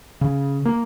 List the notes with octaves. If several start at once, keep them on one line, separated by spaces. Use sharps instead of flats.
C#3
A#3